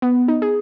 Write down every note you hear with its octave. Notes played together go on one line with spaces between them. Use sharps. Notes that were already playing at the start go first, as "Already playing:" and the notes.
B3
D#4
G#4